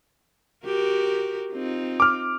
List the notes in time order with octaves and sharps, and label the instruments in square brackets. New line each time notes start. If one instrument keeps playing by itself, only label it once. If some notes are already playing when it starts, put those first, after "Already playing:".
[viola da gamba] F#4 G4 A#4
C4 D#4 F4
[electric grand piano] D6 F6